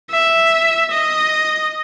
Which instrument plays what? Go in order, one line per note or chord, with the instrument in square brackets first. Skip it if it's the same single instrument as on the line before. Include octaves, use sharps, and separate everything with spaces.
[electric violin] E5
D#5